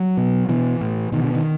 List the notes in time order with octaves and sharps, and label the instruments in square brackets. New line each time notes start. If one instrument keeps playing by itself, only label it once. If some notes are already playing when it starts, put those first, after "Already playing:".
Already playing: [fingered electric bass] F#3
B2
B2 E3
A2
B2 D#3
D3
D#3